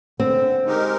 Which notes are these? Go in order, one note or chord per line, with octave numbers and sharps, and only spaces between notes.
D3 C4
G#3 D#4 G4 A#4